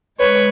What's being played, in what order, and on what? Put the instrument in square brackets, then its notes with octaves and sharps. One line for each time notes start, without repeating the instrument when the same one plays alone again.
[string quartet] G#3 B4 C#5